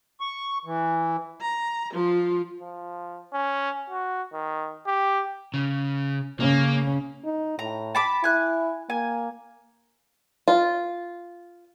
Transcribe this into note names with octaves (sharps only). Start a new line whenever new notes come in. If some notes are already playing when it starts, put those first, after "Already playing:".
C#6
E3
A#5
F3 F4
F3
C#4
F#4
D#3
G4
C#3
C#3 A#3 C#4
D#4
A2 A#5
A5 B5 D6
E4 G#5 F#6
A#3 G#5
F4